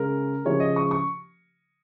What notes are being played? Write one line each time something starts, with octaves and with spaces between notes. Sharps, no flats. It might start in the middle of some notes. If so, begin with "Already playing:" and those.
Already playing: C#3 G#3 A#4
C#3 F3 G#3 C#5
D#5
C#6
C#6